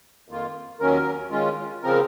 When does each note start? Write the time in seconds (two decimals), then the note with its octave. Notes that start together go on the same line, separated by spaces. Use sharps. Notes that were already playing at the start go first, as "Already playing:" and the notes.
0.28 F2 D#3 A#3 F4
0.80 D#2 D#3 F#3 C#4 A#4
1.31 D#3 G#3 C#4 F4
1.83 C#3 F3 C4 A#4